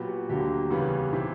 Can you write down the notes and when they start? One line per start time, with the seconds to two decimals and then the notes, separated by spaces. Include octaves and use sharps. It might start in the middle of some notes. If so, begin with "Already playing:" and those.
Already playing: A#2 F#3 B3 G4
0.09 F#4
0.29 D2 D3 F#3 A#3 G4
0.70 E2 C#3 E3 G3 B3
1.13 C3 E3